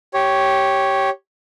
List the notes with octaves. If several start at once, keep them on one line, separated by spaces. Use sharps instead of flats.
G4 C#5